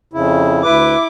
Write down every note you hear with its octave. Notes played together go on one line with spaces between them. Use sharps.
F2 C#3 E4
D2 E4 B4 D6